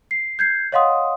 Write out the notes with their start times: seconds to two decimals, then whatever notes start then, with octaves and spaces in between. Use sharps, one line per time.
0.11 C7
0.39 G6 G#6 C7
0.72 C#5 D#5 F5 F#5 C6 D#6